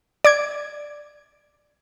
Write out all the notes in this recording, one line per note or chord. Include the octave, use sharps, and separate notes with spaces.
D5 D6 G#6